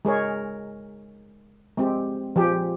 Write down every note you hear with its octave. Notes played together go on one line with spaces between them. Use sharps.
G#3 G#4 A#4 C#5
G#3 C4 G4
F3 G4 G#4